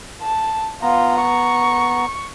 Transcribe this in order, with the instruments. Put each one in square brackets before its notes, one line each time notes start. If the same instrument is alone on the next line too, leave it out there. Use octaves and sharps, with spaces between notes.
[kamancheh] A5
[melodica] B3 A#5 [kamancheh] F4
[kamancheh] C#6